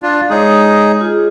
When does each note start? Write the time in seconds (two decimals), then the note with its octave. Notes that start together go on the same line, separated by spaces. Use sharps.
0.03 D4 F4
0.30 G#3 D#4 G#4 C#5
1.01 F4 G#4